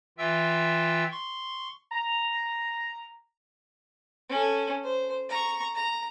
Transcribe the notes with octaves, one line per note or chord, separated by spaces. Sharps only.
E3 F4 E5 G5 E6
C6 C#6
A#5
C#4 A4
C5
A#5 C#6
A#5